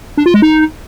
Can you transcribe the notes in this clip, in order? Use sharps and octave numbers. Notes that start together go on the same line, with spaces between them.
D4
F4
G#3
D#4